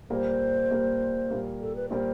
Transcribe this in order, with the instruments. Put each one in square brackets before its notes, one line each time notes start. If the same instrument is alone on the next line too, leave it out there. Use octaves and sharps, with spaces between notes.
[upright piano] A#2 G3 A#3 [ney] C5
[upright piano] A#2 G3 A#3
A#2 G3 A#3
[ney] A4
B4
[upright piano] A#2 G3 A#3 [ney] C5